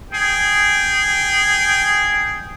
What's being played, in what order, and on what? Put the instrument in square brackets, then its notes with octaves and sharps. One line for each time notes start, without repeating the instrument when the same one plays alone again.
[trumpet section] G#4 G5